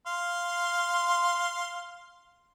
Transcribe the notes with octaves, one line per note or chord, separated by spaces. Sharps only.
F5 C6